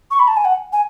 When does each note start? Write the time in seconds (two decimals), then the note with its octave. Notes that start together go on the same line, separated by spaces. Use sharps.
0.11 C#6
0.19 B5
0.28 A5
0.37 G#5
0.45 F#5
0.73 G#5